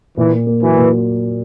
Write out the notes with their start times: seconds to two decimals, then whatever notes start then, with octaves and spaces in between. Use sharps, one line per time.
0.17 A#2 E3
0.32 A#3
0.47 A#3
0.62 E3 F#3
0.77 A#2